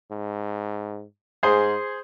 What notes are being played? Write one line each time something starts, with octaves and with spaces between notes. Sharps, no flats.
G#2
G#2 G#4 C5